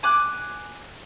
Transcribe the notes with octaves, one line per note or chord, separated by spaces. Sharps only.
G#5 D6 F#6